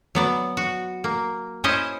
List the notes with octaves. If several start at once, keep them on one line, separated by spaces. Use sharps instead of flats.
F#3 B3 D5
F#4
A#3
C#4 E4 C5 D#5 G#5